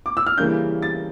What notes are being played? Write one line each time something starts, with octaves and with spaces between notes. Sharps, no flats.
D6
E6
F6
C#3 E3 G3 A#3 C#4 G6
A6